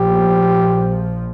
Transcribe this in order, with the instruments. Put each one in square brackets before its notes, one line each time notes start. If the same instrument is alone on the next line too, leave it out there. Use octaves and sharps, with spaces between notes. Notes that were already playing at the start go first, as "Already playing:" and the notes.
Already playing: [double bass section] A#1 A#2 F3 [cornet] G4